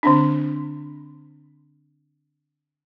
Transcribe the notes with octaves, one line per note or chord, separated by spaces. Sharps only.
D3 C4 D4